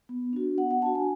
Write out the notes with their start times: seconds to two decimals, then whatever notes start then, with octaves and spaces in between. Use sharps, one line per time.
0.09 B3
0.33 D4 F#4
0.57 B3 F#5
0.71 F#5
0.82 D4 F#4 A5
0.95 G#5